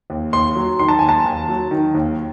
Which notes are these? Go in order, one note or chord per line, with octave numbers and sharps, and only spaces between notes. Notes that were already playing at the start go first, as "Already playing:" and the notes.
D#2
D#2 C6
F#3
D#3 C6
A5
D#2 G#5
A5
D#2
F#3
D#3
D#2